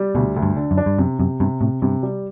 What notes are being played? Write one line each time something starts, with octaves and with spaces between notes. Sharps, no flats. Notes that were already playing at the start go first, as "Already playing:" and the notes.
Already playing: G3
D2 B2
D2
G2
D3
F#2
D4
G2
F#2 C3
F#2 C3
G2 C3
A2 C3
G2 C3
G3